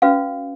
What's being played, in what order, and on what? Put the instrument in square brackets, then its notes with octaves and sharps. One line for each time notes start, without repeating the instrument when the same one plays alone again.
[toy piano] C#4 F#4 B4 F5